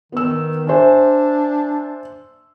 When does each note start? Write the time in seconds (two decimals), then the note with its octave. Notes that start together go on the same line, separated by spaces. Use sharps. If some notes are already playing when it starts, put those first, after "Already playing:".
0.12 D#3 B3 E6
0.67 D4 C5 E5 G#5